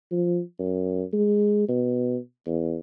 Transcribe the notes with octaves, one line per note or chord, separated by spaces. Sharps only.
F3
F#2
G#3
B2
E2